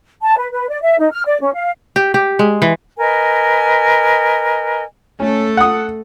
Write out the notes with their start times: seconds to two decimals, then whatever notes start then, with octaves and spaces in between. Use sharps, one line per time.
0.22 A5
0.38 B4
0.51 B4
0.69 D5
0.81 E5
0.99 D#4
1.11 F6
1.26 D5
1.40 C#4
1.54 F5
1.96 G4
2.14 G4
2.39 G#3
2.62 E3
2.98 A#4 B4 D#5 G#5
5.20 A3 C#4 A4
5.57 F#5 D#6